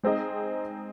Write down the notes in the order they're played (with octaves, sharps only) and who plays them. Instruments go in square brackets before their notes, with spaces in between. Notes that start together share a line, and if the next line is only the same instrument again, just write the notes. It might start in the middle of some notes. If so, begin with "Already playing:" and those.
[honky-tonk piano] G#3 C4 D#4 G#4 D#5